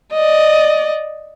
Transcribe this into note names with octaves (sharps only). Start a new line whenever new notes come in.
D5 D#5